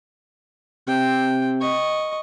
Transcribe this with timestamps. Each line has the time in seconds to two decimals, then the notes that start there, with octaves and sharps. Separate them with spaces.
0.88 C3 G5
1.61 D#5 C#6